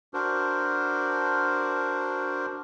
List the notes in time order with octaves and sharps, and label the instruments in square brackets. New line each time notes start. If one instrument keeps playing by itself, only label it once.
[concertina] D4 F#4 A#4 C5